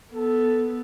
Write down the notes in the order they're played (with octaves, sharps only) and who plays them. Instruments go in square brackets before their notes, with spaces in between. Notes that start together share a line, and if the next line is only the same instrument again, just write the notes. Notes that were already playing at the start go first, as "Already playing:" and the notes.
[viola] B3 [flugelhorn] A4